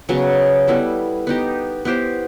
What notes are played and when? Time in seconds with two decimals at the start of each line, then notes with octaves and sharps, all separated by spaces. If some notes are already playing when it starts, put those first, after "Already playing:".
0.09 C#3 F#3 B3
0.68 G3 B3 E4 A4
1.27 B3 D#4 G4
1.85 B3 E4 G4 C5